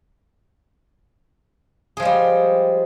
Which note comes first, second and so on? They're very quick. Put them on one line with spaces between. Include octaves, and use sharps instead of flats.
G#4 F3 G#3 G3